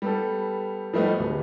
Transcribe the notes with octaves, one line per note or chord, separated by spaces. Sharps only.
G3 B3 A4
F3 G3 A3 B3 D#4
D1